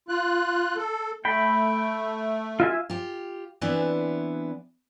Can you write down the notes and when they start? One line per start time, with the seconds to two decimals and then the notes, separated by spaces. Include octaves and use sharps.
0.09 F4 F#6
0.76 A4
1.25 A3 G5 B5
2.60 F4 E5 G#5
2.90 F4 G4
3.61 E3 B3 C4 D4 E4